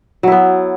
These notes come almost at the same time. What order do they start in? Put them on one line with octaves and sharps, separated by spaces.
F#3 E4 B3